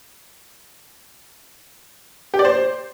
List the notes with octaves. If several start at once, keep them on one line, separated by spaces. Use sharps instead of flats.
G4
D5
C5